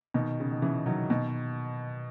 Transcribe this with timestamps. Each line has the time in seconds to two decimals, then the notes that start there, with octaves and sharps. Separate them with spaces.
0.14 B2 D#3
0.40 C#3
0.51 D#3
0.62 C#3 E3
0.86 D#3 F#3
1.10 B2 D#3